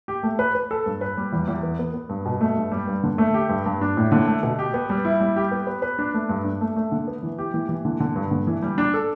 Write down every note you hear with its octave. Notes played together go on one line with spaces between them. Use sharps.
G4
A3
B4
B4
A4
G2
B4
G3
E2
E2
B3
B3
B3
G2
B2
A3
G2
G3
G2
D3
A3
G4
G2
G2
D4
A2
D3
A3
B2
G4
B3
G3
E4
G3
G4
B3
B4
B4
D4
A3
G2
D4
A3
A3
D3
B3
E3
G4
E3
E3
D3
D3
G2
D3
E3
G3
D4
A4